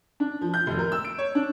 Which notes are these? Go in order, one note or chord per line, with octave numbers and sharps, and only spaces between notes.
D4
F3
G6
F1
A#4
E6
D7
C#5
D4